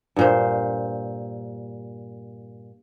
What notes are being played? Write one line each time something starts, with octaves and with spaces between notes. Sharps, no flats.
G2 A#2 C5